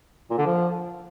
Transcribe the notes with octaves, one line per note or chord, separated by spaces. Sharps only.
A#2
D3
F3